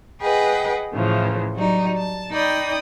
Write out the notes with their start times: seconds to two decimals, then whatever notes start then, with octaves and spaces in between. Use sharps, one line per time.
0.21 G#4 B4 D#5 F#5 G5
0.94 A2 C#3 E3 F3
1.54 F#3 G3 D#4
1.96 A5
2.32 D#4 D5 G5 B5 D#6